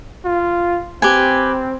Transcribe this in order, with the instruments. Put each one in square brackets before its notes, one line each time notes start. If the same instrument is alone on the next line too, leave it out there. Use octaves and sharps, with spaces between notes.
[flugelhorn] F4
[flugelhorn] C4 [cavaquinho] G4 B4 G#5